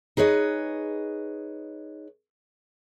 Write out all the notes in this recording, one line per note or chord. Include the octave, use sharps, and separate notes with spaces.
D#4 G#4 B4 C#5 D#5